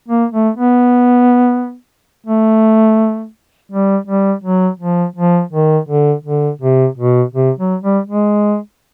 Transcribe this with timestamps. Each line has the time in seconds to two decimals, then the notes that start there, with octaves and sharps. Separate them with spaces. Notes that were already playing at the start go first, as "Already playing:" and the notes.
0.08 A#3
0.32 A3
0.57 B3
2.26 A3
3.72 G3
4.08 G3
4.44 F#3
4.80 F3
5.16 F3
5.53 D#3
5.89 D3
6.25 D3
6.62 C3
6.98 B2
7.34 C3
7.59 F#3
7.82 G3
8.07 G#3